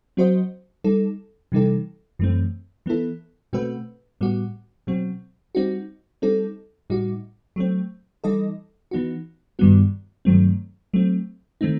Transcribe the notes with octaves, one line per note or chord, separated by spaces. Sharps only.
F#3 C4 F#4 C5 D#5
G3 D#4 A4
C3 E3 G3 D#4 A4
F#2 E3 A3 C4
E3 B3 E4 A4
B2 A3 C4 F#4 B4
A2 G3 B3 F#4
B2 F#3 C4
G3 C4 D#4 F#4
G3 C4 D#4 A4
A2 G3 D#4 F#4
F#3 A3 C4
E3 G3 D#4 A4 D#5
E3 B3 D#4 F#4
G2 D#3 G3 B3 F#4
G2 D#3 F#3 A3 C4
F#3 A3 C4
D#3 A3 C4 D#4